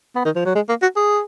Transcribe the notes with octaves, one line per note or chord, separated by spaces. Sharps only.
B3
D#3
F3
F#3
G#3
A#3
F#4
G#4